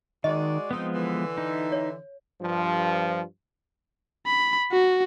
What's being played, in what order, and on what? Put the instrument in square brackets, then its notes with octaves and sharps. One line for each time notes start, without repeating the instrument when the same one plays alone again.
[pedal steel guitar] D#3 [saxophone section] G#3 F#4 D5 [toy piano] D#5
[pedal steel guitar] F3 G#3 B3 [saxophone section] C4 D#4
[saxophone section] D3 E3
[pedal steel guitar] D#4
[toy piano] C#5
[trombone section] G2 F3
[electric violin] B5
F#4